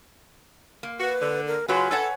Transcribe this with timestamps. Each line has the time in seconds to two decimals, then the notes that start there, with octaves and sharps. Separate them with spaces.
0.83 A#3
1.00 F#4 B4
1.22 D3
1.47 A#4
1.68 C#3 F#3 F4 F#4 B4 G#5
1.91 A4 B4 C#5 F#5